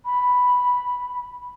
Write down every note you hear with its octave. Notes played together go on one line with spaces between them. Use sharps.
B5